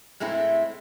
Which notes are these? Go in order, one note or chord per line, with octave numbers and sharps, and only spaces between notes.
A2 G#3 A3 C4 E4